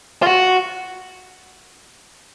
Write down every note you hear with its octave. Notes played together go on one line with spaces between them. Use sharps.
F4
F#4